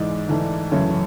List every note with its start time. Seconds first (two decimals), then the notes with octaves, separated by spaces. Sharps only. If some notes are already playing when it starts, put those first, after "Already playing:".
Already playing: G#2 E3 G#3 D5
0.29 G#2 E3 A3
0.71 F#2 C#3 E3 A3 C#5